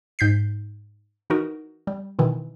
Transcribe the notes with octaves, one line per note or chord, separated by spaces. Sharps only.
G#2 G6 B6 C7
E3 D#4 F#4 A#4
G3
B2 D#3 E3